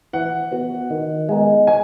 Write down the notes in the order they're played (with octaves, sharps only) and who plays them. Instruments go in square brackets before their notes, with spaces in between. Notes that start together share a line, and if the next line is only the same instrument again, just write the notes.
[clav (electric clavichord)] E3 [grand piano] F#5
[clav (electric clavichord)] B3 F#4
D#3
G#3 B3 D#4 G#4
[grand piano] G#5